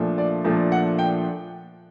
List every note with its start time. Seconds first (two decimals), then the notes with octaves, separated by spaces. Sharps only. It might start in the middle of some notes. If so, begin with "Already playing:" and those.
Already playing: A#2 F3 A3 D4
0.18 D5
0.44 A#2 F3 A3 D4
0.72 F#5
0.99 G5